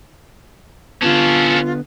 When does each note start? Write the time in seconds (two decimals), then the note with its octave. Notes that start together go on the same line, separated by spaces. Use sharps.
1.02 D3 B3 C#4 F4 A4